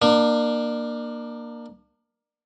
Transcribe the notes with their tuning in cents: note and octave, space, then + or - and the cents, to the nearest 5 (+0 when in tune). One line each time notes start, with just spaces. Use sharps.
A#3 +10 D4 +35